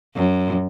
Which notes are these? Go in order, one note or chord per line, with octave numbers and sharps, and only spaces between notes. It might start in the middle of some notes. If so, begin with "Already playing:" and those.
F#2